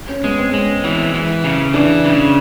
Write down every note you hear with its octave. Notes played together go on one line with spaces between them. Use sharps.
C#4
G#3 B3
C4
G#3 C#4
E3
E3
C#3
E3 D4
C#3